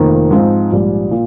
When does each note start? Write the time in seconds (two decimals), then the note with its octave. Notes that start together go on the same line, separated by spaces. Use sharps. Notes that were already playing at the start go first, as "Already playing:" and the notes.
Already playing: F1 F2 D#3 A#3
0.31 G#2 F3 C4 D#4
0.72 A#1 G#2 G3
1.11 A#2